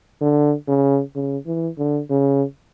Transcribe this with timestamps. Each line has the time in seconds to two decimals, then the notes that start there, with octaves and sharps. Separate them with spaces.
0.21 D3
0.68 C#3
1.15 C#3
1.47 E3
1.78 D3
2.10 C#3